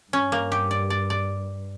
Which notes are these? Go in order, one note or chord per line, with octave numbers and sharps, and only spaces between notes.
G2 C#4
A#3
G4
D5
D5
D5